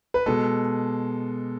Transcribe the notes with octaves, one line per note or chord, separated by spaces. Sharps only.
B4
B2 G#3 A4